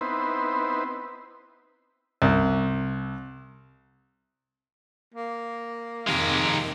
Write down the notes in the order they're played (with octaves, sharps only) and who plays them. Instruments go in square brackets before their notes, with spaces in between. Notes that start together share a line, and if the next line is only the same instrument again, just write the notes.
[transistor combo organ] B3 C4 D#4 E4 B4 C5
[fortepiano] C2
[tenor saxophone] A#3
[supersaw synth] F2 C3 D#3 [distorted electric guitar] G#3 A#4